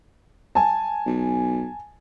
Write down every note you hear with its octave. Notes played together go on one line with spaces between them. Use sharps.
G#5 A5
B1